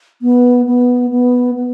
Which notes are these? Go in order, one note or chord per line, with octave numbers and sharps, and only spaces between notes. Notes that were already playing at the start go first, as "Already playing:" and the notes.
B3
B3
B3
B3